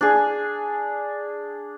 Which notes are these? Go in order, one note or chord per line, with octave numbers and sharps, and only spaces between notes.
D4 G#4